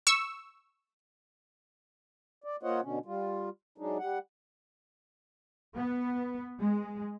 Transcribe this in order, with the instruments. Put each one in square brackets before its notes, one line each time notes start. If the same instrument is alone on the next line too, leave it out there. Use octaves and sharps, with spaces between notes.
[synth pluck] C#6 E6
[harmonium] D5
A#3 F4 C5 C#5 D#5 F#5
B2 D3 C#4
G3 F4
F#3 G#3 D4 D#4
G3 F#5
[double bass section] B3
G#3